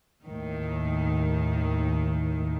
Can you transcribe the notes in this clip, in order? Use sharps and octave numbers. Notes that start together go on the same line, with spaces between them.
D#2 A2 D#3